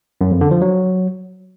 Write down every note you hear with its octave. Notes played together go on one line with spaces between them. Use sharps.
F#2
F2
D3
F3
F#3